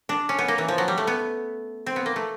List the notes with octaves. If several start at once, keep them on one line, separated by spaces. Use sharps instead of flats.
D4
C#4
B3
A#3
E3
F3
F#3
G3
A3
B3
C4
B3
A#3
A3